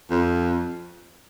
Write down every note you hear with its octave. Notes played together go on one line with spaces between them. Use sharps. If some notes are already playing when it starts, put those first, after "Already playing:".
F2